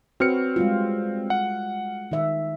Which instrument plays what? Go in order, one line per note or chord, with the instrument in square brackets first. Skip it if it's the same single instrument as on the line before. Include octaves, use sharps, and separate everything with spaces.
[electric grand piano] C4 F6 C#7 [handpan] F#4 B4 C#5
[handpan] G3 G#3 F4
[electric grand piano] F#5
[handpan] D#3 E5